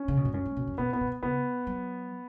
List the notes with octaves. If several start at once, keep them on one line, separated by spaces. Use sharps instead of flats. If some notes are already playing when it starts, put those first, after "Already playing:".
Already playing: C#4
C#3
B2
G#2
F#2 C#4
G#2
B2
F#2
B2 B3
B3
B2
C#3 B3
F#3